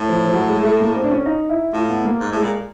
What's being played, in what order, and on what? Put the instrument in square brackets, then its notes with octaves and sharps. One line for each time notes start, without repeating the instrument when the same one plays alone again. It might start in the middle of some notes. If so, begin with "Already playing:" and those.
Already playing: [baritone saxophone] A2
[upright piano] F3
F3
F#3
G#3
A3
A#3
C4
D4
C#4
D#4
E4
[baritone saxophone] A2 [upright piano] F4
[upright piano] B3
A#3
[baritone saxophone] G#2
A2
[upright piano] G#3
[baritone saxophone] A#2